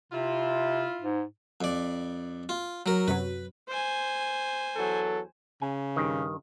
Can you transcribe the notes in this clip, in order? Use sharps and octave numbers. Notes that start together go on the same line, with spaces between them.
C3 E4 F4
G#2
F2 D5
F4
F#3 A#4
F#2 C3 F#3 B4
C5 G#5
E2 F#3 A4
C#3 G#5
G2 D#3